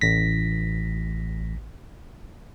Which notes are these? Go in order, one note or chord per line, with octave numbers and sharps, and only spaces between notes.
A1 A#6 B6